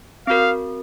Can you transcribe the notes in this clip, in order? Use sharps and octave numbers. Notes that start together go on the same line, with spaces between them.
C4 F#4 A#4 F5